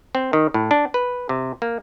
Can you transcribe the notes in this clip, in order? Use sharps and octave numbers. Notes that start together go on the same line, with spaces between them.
C4
D#3
A2
D4
B4
C3
A#3